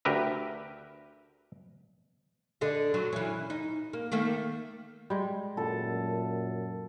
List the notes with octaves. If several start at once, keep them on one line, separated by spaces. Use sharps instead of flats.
D2 G4 A#4 B4 E5
D3 A4 D#5
F#3
E3 C#4
D#4
A#3
D#3 A3 A#3
G3 G#3
F#2 A#2 A4